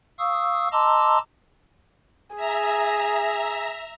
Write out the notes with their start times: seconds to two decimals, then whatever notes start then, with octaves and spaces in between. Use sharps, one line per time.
0.19 F5 C#6 D#6 E6
0.73 D#5 A5 A#5 C6 D6 E6
2.36 G#4 E5 A#5